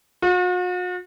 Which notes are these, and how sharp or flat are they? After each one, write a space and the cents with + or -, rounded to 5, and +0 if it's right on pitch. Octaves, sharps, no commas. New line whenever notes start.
F#4 -45